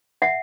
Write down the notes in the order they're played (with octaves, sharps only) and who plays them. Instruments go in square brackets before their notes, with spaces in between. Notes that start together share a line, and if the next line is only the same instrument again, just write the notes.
[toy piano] E5 F#5